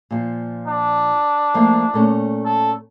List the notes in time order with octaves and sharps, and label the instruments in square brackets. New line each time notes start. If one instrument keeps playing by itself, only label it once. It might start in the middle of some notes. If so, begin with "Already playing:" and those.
[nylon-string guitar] A#2 F3
[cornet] D4
[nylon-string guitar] F3 A3 A#3
A#2 A3 C#4
[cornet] A4